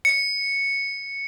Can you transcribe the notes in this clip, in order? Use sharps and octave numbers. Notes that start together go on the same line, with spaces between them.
C#7